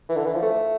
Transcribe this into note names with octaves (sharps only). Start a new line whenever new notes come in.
E3
D3
E3
F3
A3